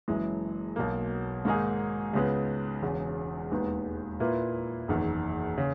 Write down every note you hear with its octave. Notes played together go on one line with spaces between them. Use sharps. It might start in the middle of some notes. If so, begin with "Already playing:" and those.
F#1 F#2 E3 G#3
B1 B2 A#3
G#2 D#3 A#3 D#4 G#4
C#2 C#3 G#3 B3
E1 E2 C#3
E1 D#2 D#3 G#3 B3
A#2 A#3 E4 B4
F#1 E2 D#3
C#3